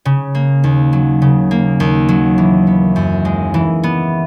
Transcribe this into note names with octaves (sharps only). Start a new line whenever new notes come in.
C#3
A#3
D#2
F#3
C#3
A#3
D#2
F#3
E3
B3
F#2
G#3
E3
B3